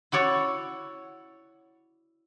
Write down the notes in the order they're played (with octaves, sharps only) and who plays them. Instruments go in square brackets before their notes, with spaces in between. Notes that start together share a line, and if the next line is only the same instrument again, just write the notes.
[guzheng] E4 F#4 C#5 D5